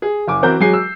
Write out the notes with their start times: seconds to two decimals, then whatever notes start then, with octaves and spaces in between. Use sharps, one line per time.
0.02 G#4
0.27 F#1 G#5 D6
0.43 E3 C4 F#4 A#4 G6
0.60 F#3 G#3 G#4 G#5 C7
0.74 E6